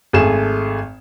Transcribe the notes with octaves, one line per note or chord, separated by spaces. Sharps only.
G#1 A3 G#4 E7